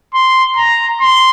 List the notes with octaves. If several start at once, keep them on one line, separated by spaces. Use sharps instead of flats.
C6
A#5
C6